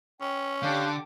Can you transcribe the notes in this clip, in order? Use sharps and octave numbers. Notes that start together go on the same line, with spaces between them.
C#4 G5
D3 G4 A4 F5 D6 F#6 G6